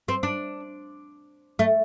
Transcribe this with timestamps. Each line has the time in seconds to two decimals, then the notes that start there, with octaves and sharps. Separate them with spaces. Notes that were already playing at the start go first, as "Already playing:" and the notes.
0.08 C4
0.23 D4
1.59 A3